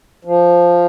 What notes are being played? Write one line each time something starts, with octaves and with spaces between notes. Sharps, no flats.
F3